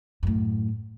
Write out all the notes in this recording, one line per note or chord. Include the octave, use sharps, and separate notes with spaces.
F#2 A2